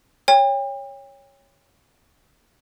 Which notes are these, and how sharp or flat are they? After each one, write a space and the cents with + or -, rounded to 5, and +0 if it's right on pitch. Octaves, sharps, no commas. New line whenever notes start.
C#5 +0 G5 +40